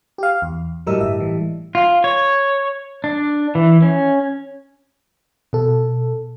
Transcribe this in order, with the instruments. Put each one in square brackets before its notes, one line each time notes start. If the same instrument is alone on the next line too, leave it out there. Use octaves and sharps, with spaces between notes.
[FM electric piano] G4 F5
E2
[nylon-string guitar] A2 G3 D#5 [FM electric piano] F#3 A#4 E6
[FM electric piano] G1 E5
E3
[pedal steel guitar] F4
C#5
D4
E3
C#4
[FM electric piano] B2 A4